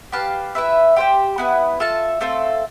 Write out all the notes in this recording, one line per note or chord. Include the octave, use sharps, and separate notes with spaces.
G4 B4 F5 A5
E4 B4 E5
G4 C5 G5
B3 E4 B4
F4 A4 E5 A5
A3 C4 F4 A4